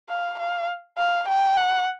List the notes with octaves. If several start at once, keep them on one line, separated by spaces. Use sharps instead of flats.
F5
F5
F5
G5
F#5